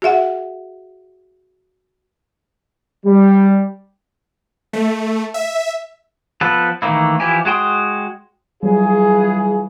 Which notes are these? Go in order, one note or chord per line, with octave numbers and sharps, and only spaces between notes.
F#4 G#4 E5 F#5
G3
A3
E5
F3 B3 A4 B4
D#3 E3 A3 A#3 E4
E3 F3 E4 G4 G#5
G#3 F#4 G5 C6 D#6
E3 F#3 G3 F4 G#4